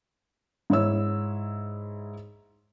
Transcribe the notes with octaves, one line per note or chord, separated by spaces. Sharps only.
G#2 E4 C#5 E6